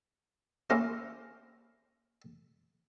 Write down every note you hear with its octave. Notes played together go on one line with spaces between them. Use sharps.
A#3 C#4 E4 A#4 C5